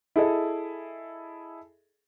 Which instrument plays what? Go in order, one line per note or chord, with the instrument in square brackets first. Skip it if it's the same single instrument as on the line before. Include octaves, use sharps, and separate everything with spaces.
[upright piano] E4 G#4 A4 D#5